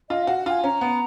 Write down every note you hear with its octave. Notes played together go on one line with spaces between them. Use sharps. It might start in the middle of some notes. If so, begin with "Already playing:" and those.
F4 D#5
F#4 F5
F#5
F4 G#5
C#4 A#5
B3